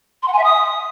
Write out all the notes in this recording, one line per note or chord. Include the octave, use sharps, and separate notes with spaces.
C6
F#5
G#5
E5
D#6